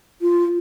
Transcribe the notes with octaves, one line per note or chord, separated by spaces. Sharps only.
F4